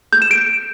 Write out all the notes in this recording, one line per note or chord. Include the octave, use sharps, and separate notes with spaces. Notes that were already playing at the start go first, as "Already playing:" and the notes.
G6
E7
D7